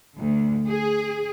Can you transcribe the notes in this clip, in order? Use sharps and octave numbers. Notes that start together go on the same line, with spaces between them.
D2
G#4